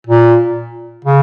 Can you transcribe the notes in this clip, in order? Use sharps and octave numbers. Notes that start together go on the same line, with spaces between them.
A#2
C#3